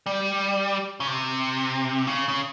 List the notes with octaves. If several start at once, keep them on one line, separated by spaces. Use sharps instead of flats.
G3
C#3
C3
C#3
C#3